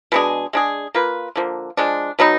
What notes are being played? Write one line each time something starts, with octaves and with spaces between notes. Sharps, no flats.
B2 G#3 D4 G#4
G#3 D4 G#4
A#3 F4 B4
D3 F3 A#3
F3 G#3 D4
B2 F#3 B3 D#4